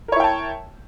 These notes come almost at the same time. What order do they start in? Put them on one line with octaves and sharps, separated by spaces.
A#4 C#5 E4 G5 A5